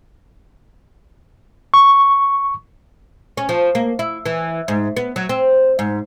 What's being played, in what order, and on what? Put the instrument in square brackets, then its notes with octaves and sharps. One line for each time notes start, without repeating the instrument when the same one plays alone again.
[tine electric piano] C#6
[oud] C#4
F3
A#3
E4
E3
G#2
B3
F#3
C4
G#2